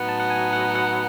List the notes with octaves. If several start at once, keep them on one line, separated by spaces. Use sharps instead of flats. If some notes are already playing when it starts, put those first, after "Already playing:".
Already playing: A2 F#3 B3 D#4 F#5
A5
F#5
G#5
F#5
F#5